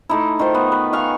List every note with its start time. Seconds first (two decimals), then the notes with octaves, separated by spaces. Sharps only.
0.09 A3 D#4 E4
0.39 D#3 F4 C5
0.54 B3
0.72 B4
0.93 F5 G#5 C#6